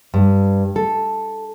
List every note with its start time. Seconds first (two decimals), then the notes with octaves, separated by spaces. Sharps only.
0.14 G2
0.76 A4